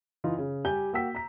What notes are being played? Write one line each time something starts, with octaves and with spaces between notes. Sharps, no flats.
E3 D#4 F4
C#3
G3 G4 G5 G#5 G6 G7
A#3 F#4 G5 E6 B6
A#5 B6